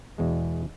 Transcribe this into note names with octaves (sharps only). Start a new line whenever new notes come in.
E2 B2 G#3